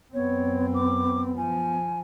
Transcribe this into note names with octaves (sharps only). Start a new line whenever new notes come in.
F#2 B3 C4 C#5
D6
F3 G#5